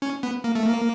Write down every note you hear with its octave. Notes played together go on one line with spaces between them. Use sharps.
C#4
B3
A#3
A3
A#3